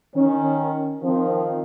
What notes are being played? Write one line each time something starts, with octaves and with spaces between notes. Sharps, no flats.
D#3 C#4
D#3 F3 C4